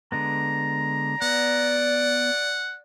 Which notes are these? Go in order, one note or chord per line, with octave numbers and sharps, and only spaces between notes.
D3 G#3 B3 A#5
B3 D5 F#5